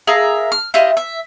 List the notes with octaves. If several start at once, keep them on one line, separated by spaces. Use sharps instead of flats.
G#4 A#4 E5 F5
F6
E4 F4 G4 D#5
E5